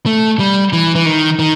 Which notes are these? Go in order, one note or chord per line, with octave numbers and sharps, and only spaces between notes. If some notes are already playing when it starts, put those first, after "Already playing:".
A3
G3
E3
E3
D#3
D#3